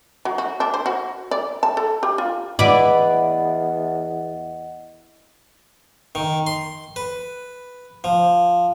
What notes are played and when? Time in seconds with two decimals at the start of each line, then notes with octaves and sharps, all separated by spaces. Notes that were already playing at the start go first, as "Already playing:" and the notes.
0.25 F#3
0.38 F#4
0.60 D4
0.74 C5
0.86 F#4
1.31 D5
1.63 A5
1.77 A4
2.03 G4
2.18 F4
2.59 E2 E4 B4 D5 D#5 F#5 B5
6.15 D#3
6.47 C6
6.96 B4
8.04 F3